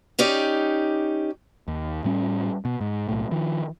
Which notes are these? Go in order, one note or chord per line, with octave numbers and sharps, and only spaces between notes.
C#4 D#4 G4 D5
D#2
A2 G3 C#4
B2
G#2
B1 A2
D#3 F3